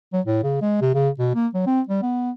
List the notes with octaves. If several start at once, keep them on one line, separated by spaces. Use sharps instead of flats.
F#3
A2
C#3
G#3
C3
C#3
B2
A#3
F#3
C4
G3
B3